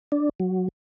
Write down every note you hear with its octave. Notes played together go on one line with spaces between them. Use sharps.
D4
F#3